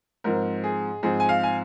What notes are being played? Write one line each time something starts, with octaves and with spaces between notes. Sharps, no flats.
G#2 F3 C4 A#4
G#4
G#2 F3 C4 G#4
G#5
F5
G#5